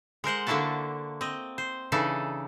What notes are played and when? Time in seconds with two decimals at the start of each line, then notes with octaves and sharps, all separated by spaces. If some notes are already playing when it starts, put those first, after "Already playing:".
0.24 G#3 A#4 C5 F#5
0.47 D3 A#3 D4 E4 F#4 A5
1.21 C4 D#5
1.58 C5
1.92 C#3 E3 D4 D#4 A4